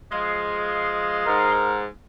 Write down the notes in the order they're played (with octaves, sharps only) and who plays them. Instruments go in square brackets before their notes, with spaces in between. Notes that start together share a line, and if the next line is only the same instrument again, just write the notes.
[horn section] F3 G#3 [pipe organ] D#5 F5 C6
[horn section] G#2 [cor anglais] A#4